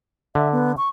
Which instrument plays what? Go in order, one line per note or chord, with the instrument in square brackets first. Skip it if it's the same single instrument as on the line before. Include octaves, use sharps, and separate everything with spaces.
[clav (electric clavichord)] D3 [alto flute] E5
[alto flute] B3
C#6